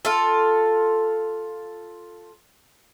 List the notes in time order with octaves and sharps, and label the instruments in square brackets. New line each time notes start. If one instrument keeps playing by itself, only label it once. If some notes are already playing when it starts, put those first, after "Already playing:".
[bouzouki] F4 A4